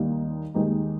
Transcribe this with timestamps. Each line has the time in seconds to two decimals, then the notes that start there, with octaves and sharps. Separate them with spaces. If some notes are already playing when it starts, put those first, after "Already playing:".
Already playing: D#2 D#3 G3 A#3 D#4
0.54 D#2 D#3 G#3 D#4 G4